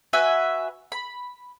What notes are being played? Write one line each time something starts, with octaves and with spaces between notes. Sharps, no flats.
F#4 B4 E5 G#5
B5